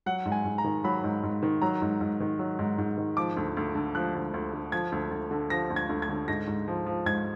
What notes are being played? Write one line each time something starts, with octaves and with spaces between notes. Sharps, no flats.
F#3 F#5
G#2
G#5
G#2
A#5
D#3
F#3 B5
G#2
G#2
D#3
F#3 A#5
G#2
G#2
D#3
F#3
G#2
G#2
D#3
F3 D6
D2
D2
D3
F3 F#6
D2
D2
D3
F3 G#6
D2
D2
D3
F3 A#6
D2
G#6
D2
G#6
D3
G#2 A#6
G#2
F3
F3
G#2 G#6